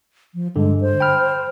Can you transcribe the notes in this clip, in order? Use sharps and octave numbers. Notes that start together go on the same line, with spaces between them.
F3
G2 D3 G#3
C5
G5 B5 F6